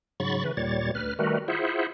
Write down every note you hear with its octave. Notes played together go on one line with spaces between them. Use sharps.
G#2 C#3 F#3 B5 C#6 A6
C#3 E3 B4
D#2 A#2 G3 C#5 A6
D2 B4 F6
D#3 G3 A3 F#4 A#4 B4
E4 F4 G#4 C5 E5 F#5